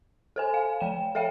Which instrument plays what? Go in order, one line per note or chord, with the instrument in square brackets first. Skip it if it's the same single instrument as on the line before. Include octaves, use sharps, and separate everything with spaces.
[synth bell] A4 C5 G#5
F5
F3 G5 E7
A4 C#5 E5 F5 G5